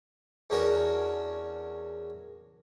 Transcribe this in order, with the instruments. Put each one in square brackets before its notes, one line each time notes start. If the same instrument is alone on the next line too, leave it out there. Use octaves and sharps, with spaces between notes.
[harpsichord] E2 C#4 D4 F#4 A#4